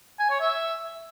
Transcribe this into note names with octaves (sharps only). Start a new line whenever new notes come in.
G#5
C#5
E5